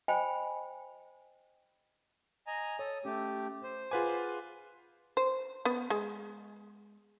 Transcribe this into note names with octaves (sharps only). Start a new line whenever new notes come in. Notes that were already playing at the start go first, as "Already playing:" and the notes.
C5 D#5 G5 G#5 B5
D#5 G#5 A#5
A4 C#5 D#6
A3 C#4 G4
C5
F4 G#4 B4 F#5 G#5 D6
C5
B3
G#3